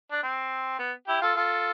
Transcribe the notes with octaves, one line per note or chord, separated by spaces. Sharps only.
D4
C4
B3
E4 G4
F4 A4
F4 A4